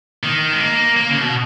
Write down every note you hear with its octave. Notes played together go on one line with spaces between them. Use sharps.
D#3
G#3
A#3
A#3
C#3
B2